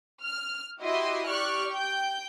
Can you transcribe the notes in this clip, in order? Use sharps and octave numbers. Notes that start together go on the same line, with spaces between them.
F6
E4 F#4 G4 D#5 E5 C6
G4 D5 C#6 F6 F#6
G5 G6